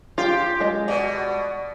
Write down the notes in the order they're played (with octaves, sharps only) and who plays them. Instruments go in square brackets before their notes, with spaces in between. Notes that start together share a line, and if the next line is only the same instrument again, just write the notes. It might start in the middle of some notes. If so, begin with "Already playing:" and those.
[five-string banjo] F4 F5 [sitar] G4
[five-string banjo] G#3 D#5
[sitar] B2 [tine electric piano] D5